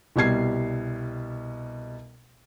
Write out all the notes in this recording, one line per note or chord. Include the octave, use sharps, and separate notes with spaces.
C2 B2 G3 G#6 C7